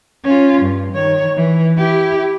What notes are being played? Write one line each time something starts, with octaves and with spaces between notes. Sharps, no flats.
C#4 F4
G2
D#3 C#5
E3
E4 G4